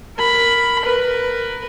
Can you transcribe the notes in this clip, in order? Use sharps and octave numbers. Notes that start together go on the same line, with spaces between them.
A#4 B5
A#4 B4